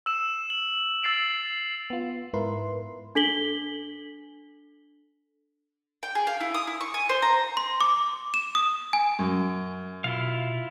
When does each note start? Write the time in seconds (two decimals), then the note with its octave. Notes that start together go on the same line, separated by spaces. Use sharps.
0.06 E6 E7
0.50 F#7
1.02 E6 A6 C7 D7 F7
1.90 B3 F4
2.34 G#2 E4 A#4 B4 C6
3.15 D4 A4 B6 F#7 G7
6.03 G5
6.15 G#4
6.27 F5
6.41 E4
6.54 D#6
6.67 E4
6.81 C#6
6.94 G#5
7.09 C5
7.22 A#5
7.57 C6
7.81 D6
8.34 E7
8.55 D#6
8.93 G#5
9.19 F#2
10.04 B2 E4 F4 F5